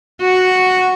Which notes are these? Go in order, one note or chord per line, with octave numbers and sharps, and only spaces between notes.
F#4